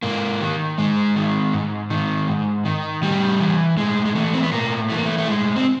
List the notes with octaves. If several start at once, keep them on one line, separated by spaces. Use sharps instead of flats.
G#2 A#3
D#3
G#2 G#3
D#3
G#2
D#3
G#2
D#3
A2 G3
E3
A2 G#3
G#3
E3 A3
C4
B3
A2 A#3
E3 A3
A#3
A3
A3
A2 G#3
C4